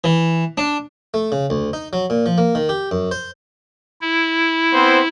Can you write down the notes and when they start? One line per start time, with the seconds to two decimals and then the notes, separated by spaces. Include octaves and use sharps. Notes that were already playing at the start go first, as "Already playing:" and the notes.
0.04 E3
0.58 D4
1.14 A3
1.32 C#3
1.50 D2
1.73 D#4
1.93 F#3
2.10 A#2
2.26 F3
2.38 A#3
2.55 D#3
2.69 G4
2.91 F#2
3.11 C5
4.01 E4
4.74 B3 C4 C5